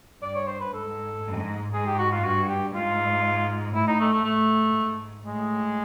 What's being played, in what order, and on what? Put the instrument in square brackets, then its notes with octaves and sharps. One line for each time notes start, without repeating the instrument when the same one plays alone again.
[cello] G2 [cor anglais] D5
[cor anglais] C#5
C5
B4
[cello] G#2 [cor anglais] A4
[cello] G#2
[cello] G#2 [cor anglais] G#4
[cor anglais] G4
F#4
F4
[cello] G2 [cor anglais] F#4
[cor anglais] G4
[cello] G#2 [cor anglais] F4
[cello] A2 [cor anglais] E4
[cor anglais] D#4
A3
A3
[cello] A2 [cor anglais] A3
[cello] G#2
[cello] A2 [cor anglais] G#3